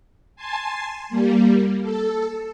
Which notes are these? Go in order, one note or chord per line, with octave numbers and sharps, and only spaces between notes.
G#5 A5 C6
G3 A#3
A4